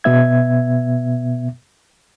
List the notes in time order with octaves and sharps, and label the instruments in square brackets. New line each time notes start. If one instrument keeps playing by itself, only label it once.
[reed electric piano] B2 B3 E5 G#6